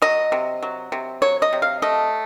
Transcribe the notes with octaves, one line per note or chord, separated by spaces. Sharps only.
F#3 D#5
C3
F#3
C3
F#3 C#5
D#5
C3
F5
A3 D#5